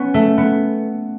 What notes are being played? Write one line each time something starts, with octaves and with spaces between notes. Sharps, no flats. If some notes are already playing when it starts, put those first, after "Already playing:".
Already playing: B3 C#4
A3
B3